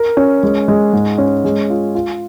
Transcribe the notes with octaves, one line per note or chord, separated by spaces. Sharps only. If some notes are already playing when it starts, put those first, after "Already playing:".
Already playing: A#4
C#4
G#3
G#3
G#2
C#4
G#3
F4
F4